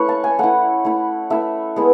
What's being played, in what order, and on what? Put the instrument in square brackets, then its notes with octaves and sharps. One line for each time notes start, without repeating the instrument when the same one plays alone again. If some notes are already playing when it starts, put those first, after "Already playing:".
Already playing: [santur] A3 C#4 E4 B4 C#5 B5 C#6
A5
G#5
A3 E4 F#5
A3 E4
A3 E4 E5
G#3 B3 E4